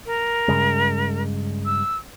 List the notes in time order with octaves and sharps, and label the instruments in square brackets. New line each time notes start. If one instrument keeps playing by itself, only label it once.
[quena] A#4
[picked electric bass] G2 C#3 G#3
[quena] E6